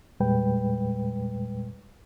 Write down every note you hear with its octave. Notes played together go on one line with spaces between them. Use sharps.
E2 A#2 G3 G#3 B4 G5